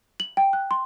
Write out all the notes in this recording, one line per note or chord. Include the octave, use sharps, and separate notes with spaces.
F#7
G5
F#6
C6